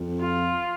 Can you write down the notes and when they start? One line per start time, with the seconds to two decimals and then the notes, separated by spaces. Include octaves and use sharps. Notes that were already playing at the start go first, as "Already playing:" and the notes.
Already playing: F2
0.20 F4